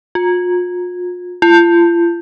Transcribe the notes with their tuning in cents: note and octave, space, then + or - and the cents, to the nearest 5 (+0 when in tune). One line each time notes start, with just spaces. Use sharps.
F4 +40
F4 -40